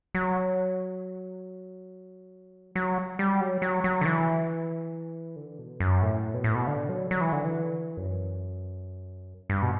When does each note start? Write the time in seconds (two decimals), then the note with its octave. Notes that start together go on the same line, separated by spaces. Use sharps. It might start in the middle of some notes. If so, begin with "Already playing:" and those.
0.15 F#3
2.75 F#3
3.19 G3
3.41 F#3
3.62 F#3
3.84 F#3
4.01 D3
4.05 E3
5.36 D3
5.59 B2
5.80 F#2
6.02 A2
6.34 B2
6.44 A2
6.55 B2
6.67 D3
6.89 F#3
7.11 F#3
7.21 E3
7.32 D3
7.44 E3
7.97 F#2
9.50 G2
9.62 B2